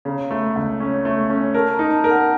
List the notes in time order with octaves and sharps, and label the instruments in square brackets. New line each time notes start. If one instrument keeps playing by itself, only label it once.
[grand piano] C#3 [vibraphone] A#5
[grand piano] A3
C#2
C#4
A3
C#4
[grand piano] A#4 [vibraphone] A5
[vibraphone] A#5
[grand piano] D#4
[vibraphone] A5
[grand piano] A#4
[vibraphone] F#5